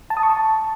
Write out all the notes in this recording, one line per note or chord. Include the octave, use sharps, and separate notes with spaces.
A5
D#6
C#6
A5